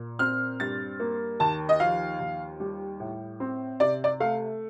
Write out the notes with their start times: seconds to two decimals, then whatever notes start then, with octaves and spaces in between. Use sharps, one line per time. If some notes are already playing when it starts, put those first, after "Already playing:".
Already playing: A#2
0.19 C4 F6
0.60 G2 A6
1.00 A#3
1.40 D#2 A5
1.69 D#5
1.80 F3 F5
2.20 D#2
2.60 G3
3.00 A2
3.40 C4
3.80 C3 D5
4.04 D5
4.20 A3 F5